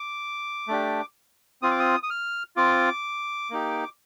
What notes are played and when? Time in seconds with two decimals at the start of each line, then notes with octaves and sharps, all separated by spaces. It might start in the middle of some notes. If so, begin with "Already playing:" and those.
Already playing: D6
0.68 A3 D4 G4
1.62 C4 F4 D#6
1.71 D6
1.80 D#6
2.03 D#6
2.10 F6
2.57 C4 F4 D6
3.51 A#3 D#4 G4